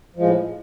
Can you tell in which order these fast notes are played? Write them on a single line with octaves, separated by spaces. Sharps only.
F3 G#3 A2